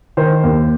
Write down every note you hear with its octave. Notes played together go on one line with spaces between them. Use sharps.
D#3 C5
D#2